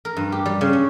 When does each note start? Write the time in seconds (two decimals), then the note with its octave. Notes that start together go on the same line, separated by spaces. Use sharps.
0.05 A#4
0.17 G2
0.32 G4
0.46 G3
0.61 C#3
0.73 C#4